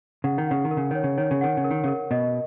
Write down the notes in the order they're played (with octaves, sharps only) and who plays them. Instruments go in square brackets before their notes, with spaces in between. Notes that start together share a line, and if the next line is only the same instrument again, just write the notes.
[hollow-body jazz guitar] C#3 [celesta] F#5
[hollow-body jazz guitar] D#3
[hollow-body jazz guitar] C#3 [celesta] F#5
[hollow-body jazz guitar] D#3
[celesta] A#4
[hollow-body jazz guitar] C#3
[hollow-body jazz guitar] D#3 [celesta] C#5
[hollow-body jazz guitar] C#3
[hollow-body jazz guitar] D#3 [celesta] C#5
[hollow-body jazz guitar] C#3
[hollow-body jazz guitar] D#3 [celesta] F#5
[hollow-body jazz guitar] C#3
[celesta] A#4
[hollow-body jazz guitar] D#3
C#3
[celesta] A#4
[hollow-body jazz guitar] B2 [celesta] D#5